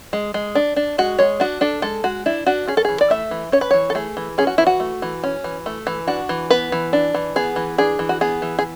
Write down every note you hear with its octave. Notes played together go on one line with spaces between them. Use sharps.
G#3
G#3
D4
D4
G#3 F#4
G#3 C#5
D4 F#4
D4 A4
G#3 A4
G#3 F#4
D4 E4
D4 F#4
C#4 G#4
A4
E3 G#4
D5
A3 E5
E3
C#4 C#5
B4
E3 C#5
A4
A3 G#4
E3
C#4 G#4
F#4
E3 E4
F#4
A3
E3
C#4
E3
A3
E3
D4 F#4
E3
B3 B4
E3
D4
E3
B3 G#4
E3
D4 G#4
E3
F#4
B3 G#4
E3
G#4